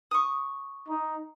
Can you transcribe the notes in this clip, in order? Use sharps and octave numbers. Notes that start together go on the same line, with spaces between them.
C#6 D#6
D#4